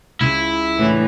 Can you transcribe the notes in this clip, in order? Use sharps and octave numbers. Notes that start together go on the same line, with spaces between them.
C#2 C#3 E4
A2 D3 E3